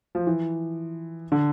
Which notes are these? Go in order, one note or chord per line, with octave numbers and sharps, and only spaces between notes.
F3
E3
D3